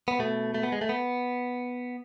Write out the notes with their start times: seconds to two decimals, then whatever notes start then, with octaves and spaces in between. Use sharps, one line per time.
0.08 B3
0.19 B2 A3
0.54 A3
0.63 B3
0.72 G#3
0.81 A3
0.89 B3